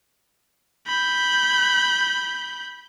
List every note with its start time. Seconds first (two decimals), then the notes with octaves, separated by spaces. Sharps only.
0.88 B5 G6